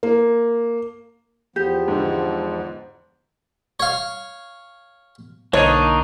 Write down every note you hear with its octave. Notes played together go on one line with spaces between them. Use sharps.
A#3
E2 F3 B3 G4
G#2 D3
C#5 F5
B1 D3 A#3 D4 D#4 C#5 D#5